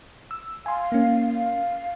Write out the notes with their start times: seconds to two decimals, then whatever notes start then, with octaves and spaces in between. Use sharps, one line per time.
0.31 E6
0.66 F5 G#5 C6
0.92 A#3 C#4
1.29 F5